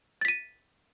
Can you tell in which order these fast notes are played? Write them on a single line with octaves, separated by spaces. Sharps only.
A6 B6 D#7